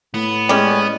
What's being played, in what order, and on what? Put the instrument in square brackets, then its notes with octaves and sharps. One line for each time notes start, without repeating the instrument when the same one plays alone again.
[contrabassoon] A2 [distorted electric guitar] B3
[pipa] G3 C#4 [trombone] G#3